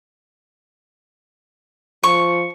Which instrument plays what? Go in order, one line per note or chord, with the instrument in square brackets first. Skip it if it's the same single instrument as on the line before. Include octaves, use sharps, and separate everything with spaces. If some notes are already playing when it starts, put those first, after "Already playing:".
[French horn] F3 [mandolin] C#6